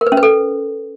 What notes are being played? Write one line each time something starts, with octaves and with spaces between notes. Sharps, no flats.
A#4
B4
C#4
B4
A4